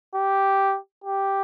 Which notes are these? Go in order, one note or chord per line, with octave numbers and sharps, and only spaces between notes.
G4
G4